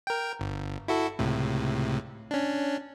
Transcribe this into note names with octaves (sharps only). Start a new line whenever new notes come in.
A#4 G5
G1
E4 F#4 A4
C#2 A2 C3
C#4 D4